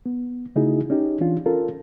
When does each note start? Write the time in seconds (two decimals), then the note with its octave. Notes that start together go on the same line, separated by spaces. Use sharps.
0.06 B3
0.56 C#3 A3 D#4 E4 F#4 G#4
0.90 C#4 D#4 G4
1.20 E3 C#4 D4 F4
1.46 C#4 F4 A4 A#4